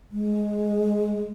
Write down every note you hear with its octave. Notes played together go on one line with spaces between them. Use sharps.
G#3